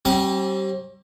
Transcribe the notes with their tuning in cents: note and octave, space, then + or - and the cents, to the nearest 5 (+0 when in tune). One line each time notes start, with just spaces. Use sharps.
G3 -30 C4 +40 D6 +0